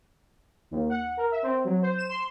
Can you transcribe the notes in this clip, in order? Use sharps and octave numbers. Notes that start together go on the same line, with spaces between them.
D#2
F#5
A#4
E5
C4
F#3
C5
E7
C6